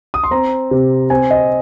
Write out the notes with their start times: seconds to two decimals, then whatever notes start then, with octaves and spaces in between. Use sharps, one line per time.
0.14 D#6
0.23 C6
0.31 C4 A#5
0.71 C3
1.10 C4 G#5
1.31 D#5